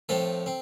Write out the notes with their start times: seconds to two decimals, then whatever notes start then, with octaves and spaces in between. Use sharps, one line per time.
0.09 A2 F3 C4 A4
0.46 C4